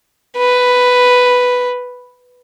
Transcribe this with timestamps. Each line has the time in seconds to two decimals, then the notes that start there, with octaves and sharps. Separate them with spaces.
0.37 B4